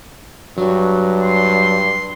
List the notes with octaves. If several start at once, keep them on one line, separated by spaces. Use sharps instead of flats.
G2 F#3
C6